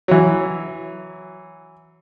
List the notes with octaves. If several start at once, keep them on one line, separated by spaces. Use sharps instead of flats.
E3 F#3